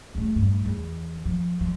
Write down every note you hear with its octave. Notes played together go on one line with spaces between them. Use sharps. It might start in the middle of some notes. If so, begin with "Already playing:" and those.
A#1 A3
G2
E2 E3
F3
F3